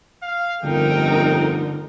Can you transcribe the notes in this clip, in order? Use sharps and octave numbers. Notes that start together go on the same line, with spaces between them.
F5
G1 F2 D3 A3 D#4 A#4 G5